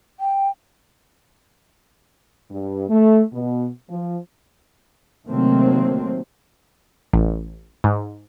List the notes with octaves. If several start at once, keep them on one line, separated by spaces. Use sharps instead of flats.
G5
G2
A3
B2
F3
C3 D#3 F#3 A3 A#3 C4
A1
G#2